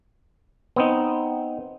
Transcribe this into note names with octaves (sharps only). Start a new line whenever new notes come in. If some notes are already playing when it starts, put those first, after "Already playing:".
B3 C4 D#4